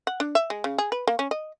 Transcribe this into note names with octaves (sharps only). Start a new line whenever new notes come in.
F#5
D4
E5
G#3
C#3
G#4
B4
A#3
C#4
D#5